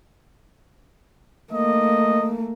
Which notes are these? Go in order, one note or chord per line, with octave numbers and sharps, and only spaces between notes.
A3 A#3 D#5